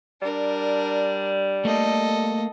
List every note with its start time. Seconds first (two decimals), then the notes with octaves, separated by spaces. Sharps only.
0.22 G3 D4 A#4
1.65 A3 A#3 A4 D#5